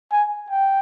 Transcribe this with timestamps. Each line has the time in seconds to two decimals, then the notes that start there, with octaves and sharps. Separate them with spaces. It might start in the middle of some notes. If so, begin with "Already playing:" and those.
0.12 G#5
0.51 G5